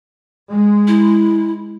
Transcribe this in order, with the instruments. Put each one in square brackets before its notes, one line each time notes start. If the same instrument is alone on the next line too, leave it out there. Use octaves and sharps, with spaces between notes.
[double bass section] G#3
[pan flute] E4